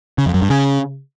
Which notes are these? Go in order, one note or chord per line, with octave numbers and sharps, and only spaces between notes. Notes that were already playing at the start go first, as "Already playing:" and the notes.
C#3
F2
F#2
G2
C#3